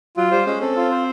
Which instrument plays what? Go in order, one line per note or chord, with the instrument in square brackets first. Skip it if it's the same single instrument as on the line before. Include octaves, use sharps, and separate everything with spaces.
[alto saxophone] F#3 [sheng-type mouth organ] F4
[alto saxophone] G3 [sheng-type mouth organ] C5
[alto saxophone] G#3 [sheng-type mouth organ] C#4
[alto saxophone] C4 [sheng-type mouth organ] A4
[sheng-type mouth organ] F4
C5